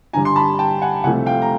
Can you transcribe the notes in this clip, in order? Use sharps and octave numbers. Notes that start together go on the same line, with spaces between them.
G2 D3 G3 G#5 A#5
C6
A5 B5
G5 A5
F#5 G#5
C2 C3 F3 A3 F#5 G#5
F5 G5
A#5